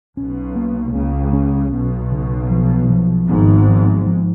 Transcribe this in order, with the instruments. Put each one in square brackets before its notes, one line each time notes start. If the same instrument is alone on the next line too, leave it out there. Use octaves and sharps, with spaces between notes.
[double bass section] B1 B2 [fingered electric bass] C#4
[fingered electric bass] A#3
[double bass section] C#2 C#3 [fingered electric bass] C#4
[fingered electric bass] C#4
[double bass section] B1 B2 [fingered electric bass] B3
[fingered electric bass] C#3
F3
F3
[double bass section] G#1 G#2 [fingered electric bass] B3
[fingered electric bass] F3
F3